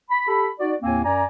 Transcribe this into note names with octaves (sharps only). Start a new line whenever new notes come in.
B5
G4 A4 B5
D#4 F#4 D5
D#2 A2 A#3 C4 G#5
F#2 D5 G#5 A#5